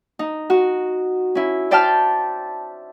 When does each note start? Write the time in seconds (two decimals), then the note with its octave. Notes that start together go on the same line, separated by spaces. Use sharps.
0.19 D#4
0.50 F#4
1.35 C#4 E4
1.71 C5 D5 E5 G5 A5 F6